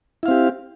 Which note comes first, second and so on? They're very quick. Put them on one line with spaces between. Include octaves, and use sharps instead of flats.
E4 F5 C4 G4